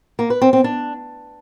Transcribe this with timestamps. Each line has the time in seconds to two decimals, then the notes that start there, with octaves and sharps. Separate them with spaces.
0.19 A#3
0.30 B4
0.42 C4
0.53 C4
0.64 D4